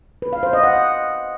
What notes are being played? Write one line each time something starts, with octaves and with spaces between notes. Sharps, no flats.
B4
F5
C5
D#5
F#5